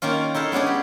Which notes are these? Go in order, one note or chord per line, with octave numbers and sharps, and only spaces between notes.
D#3 A#3 C#4 F4
D#4 E4 A4 F5
G#3 B3 C#4 D4 G#4
G4